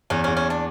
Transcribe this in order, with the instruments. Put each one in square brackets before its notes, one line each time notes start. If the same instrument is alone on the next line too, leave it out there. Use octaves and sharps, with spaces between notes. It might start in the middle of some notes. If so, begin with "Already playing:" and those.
[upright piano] E2 [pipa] C#4
[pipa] C#4
[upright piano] E2
[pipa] C#4
D4